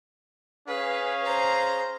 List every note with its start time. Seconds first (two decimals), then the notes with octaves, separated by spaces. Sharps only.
0.68 C#4 G#4 B4 F5
1.24 C5 A#5